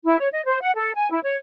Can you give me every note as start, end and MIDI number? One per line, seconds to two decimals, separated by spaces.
0.05 0.18 64
0.19 0.27 73
0.32 0.41 75
0.45 0.59 72
0.61 0.71 78
0.76 0.91 69
0.95 1.08 80
1.11 1.19 64
1.24 1.36 73